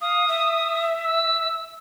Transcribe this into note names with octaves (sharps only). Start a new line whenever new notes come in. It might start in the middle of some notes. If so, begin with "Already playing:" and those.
F5 D#6
E5
E6